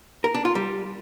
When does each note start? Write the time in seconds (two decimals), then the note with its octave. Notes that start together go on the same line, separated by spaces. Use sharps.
0.24 A#4
0.34 D4
0.45 F4
0.55 G3